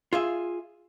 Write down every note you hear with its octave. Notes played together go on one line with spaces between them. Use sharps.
F4 G#4 E5